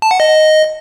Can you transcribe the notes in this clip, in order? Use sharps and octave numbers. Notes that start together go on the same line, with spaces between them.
A5
F#5
D#5